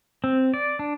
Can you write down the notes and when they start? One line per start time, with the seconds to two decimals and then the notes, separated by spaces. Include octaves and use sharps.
0.24 C4
0.54 D5
0.79 D4